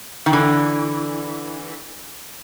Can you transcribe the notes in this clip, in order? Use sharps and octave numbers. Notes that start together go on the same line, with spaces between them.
D#3
D3 E3